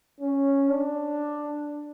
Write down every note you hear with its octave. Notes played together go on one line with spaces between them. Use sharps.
C#4
D4